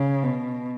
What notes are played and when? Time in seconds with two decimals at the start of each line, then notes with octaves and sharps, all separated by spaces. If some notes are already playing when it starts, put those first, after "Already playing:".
Already playing: C#3
0.23 B2